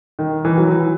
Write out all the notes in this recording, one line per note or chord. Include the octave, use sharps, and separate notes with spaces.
D#3
E3
F#3
E3